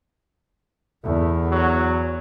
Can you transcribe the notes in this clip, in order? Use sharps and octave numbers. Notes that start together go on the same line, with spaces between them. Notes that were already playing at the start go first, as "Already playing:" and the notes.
E2 A3
F#3